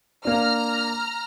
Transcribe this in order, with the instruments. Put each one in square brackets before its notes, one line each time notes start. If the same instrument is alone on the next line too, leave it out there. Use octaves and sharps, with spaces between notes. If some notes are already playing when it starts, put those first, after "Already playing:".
[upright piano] A#3 D4 [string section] A#5 F6